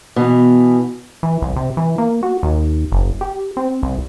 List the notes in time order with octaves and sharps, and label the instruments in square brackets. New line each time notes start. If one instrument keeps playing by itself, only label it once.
[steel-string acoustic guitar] B2 E3
[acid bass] E3
C2
C3
E3
A#3
F#4
D#2
F#1
G4
C4
C2